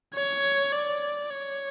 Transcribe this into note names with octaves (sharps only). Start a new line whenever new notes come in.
C#5
D5
C#5